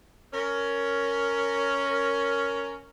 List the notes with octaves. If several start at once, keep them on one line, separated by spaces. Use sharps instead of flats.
C#4 A#4